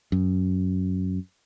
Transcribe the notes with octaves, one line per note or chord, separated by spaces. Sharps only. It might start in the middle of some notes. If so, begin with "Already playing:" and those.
F#2